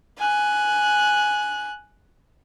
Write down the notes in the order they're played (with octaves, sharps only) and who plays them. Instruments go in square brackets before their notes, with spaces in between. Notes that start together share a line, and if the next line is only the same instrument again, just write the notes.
[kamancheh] G#5 F#6